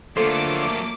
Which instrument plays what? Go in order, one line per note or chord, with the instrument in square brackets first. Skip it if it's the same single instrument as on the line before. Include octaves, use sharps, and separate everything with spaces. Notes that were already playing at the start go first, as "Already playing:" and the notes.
[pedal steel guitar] D3 F4 C5 [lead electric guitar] F#3 A3 [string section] A#3 D6 [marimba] A4